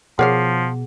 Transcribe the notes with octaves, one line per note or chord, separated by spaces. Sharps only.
B2 F3 G#4 A#4 C#5 F5 F#5